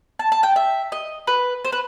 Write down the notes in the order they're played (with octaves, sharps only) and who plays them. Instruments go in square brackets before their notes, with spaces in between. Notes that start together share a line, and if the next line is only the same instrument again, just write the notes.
[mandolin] A5
A5
G5
E5
D#5
B4
C5
B4